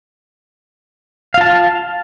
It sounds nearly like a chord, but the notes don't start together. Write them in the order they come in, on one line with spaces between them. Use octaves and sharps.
F5 F4 A5